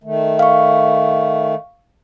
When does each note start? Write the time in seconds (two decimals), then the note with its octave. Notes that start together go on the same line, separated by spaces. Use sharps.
0.04 D#3 A3
0.39 F5 C#6